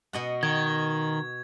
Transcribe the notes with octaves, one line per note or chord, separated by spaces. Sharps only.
B2 D#5 F#5
D#3 G#6